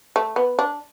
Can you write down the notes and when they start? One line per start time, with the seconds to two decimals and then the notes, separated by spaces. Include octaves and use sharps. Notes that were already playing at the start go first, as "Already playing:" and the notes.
0.16 A3
0.36 B3
0.59 D4